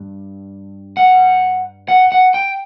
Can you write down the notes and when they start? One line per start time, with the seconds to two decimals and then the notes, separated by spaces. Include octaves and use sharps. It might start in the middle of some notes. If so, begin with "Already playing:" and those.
Already playing: G2
0.97 F#5
1.88 F#5
2.12 F#5
2.34 G5